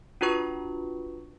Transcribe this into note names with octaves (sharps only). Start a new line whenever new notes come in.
D4 F4 F#4 B4 C#6